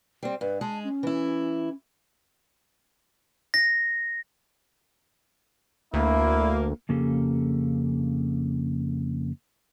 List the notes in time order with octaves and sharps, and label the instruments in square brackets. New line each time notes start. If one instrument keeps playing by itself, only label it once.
[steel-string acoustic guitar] G3 C4
[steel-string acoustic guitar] G2 [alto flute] B4
[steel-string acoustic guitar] G#3 G#4 [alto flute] A5
[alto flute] C#4
[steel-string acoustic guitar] E3 E4
[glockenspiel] A#6
[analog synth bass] D2 [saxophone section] A#3 [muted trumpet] E4
[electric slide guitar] F2 C#3 A#3 C#4 G4 A4